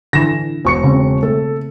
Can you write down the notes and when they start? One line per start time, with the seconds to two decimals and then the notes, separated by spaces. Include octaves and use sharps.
0.13 D3 E3 A#6 E7
0.65 E1 B3 C#6 C#7
0.83 C#3 C4
1.23 A3 A4